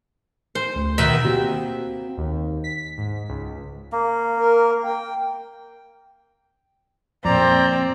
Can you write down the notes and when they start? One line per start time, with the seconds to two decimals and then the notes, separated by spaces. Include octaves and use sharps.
0.55 C5
0.76 D2
0.98 B2 D#3 E5
1.23 A#3 C4 F#4 G4
2.17 D#2
2.64 B6
2.98 G#2
3.29 C#2
3.92 A#3
4.38 A#4
4.84 G5
7.25 F2 A#2 C4 D5 A#5